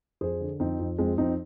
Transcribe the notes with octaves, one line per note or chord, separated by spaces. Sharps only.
F2 G#4 C5
D3
F2 C4 D#4
F2
F2 G#3 C4
F2 C4 D#4